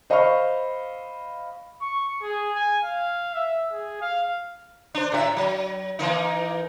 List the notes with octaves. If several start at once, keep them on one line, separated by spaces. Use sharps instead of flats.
C5 D#5 F5 B5 C#6 F6
C#6
G#4
G#5
F5
E5
G#4
F5
D4 C5
A2 F#4 E5
F#3
E3 A#3 D#4